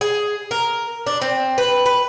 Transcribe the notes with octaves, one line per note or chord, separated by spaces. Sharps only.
G#4
A#4
D4
C4
B4
B4